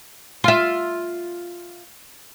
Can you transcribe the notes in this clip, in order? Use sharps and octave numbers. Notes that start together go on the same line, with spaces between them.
F4 E5